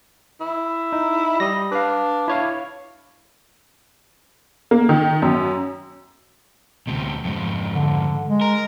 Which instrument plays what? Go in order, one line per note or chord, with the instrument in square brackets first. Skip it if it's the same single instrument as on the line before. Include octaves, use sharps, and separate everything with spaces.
[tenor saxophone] E4
[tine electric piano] D#4
[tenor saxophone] G3 [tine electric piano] D#6 A#6
[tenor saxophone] D4 [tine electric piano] B4 F5
[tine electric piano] E4 C#5 F5
[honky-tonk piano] A#3
D#3
F#2
[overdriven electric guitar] D2 C3
F2 G#2
[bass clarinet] D3
G#3
[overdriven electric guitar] A#4